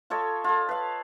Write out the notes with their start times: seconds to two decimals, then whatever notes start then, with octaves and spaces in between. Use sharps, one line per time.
0.10 F4 A4 C#5 D#5
0.44 F4 A4
0.69 B4 F5